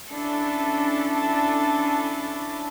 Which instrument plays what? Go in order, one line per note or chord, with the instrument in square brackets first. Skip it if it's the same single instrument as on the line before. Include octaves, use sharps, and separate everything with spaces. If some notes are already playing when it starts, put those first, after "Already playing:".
[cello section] C#4 D4 E4 A4